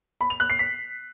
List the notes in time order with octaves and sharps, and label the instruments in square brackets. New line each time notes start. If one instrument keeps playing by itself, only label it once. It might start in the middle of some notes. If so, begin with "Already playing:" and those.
[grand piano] B5
F7
F#6
C7
B6